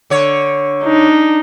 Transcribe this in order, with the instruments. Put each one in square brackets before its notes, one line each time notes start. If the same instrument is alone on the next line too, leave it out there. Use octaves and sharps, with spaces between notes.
[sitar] D3 C#5
[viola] D4 D#4